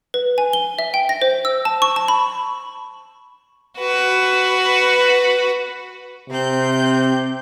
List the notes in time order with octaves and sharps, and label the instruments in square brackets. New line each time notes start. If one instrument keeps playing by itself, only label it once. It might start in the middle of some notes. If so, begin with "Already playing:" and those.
[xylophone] B4
G#5
G7
E5
G5
A#6
C5
E6
A5
C#6
A5
B5
[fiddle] F#4 B4
[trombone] C3 [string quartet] C4 G6